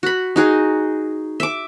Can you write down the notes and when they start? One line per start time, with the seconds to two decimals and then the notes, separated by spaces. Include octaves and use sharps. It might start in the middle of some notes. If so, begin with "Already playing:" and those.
0.03 F#4 B5
0.36 D#4 F#4 G#4
1.40 E5 D6